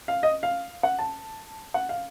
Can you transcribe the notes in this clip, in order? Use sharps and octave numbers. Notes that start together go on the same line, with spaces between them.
F5
D#5
F5
F#5
A5
F#5
F5